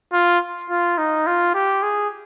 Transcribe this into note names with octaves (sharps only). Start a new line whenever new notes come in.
F4
F4
D#4
F4
G4
G#4